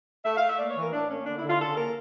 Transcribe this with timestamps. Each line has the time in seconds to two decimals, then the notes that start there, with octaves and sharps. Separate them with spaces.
0.24 A3 E5
0.36 F5
0.41 A3
0.48 E5
0.58 A#3 D5
0.70 C#5
0.75 E3
0.82 A#4
0.92 A2 D4
1.09 A#3 C#4
1.26 D3 D4
1.38 D3 E4
1.49 F4
1.60 C#3 A4
1.76 A#3 A#4